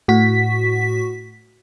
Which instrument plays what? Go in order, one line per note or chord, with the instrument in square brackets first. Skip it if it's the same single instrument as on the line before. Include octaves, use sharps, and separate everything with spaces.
[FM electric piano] A2 F#4 B6